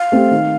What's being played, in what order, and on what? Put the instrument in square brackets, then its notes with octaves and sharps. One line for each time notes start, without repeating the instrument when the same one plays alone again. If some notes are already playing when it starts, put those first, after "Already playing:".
Already playing: [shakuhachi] F5
[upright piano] A3 C4 G4
D#3